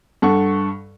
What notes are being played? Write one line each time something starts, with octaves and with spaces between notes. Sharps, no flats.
G2 A4 F#5 C#6